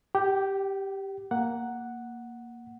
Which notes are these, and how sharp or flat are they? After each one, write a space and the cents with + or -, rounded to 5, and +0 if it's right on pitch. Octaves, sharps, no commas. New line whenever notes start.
G4 +0 G5 -40
A#3 +0 F#5 +0